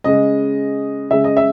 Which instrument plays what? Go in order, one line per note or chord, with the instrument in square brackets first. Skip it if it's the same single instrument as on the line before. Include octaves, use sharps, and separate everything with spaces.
[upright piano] C#3 G#3 D#5
C#3 G#3 E5
D#5
E5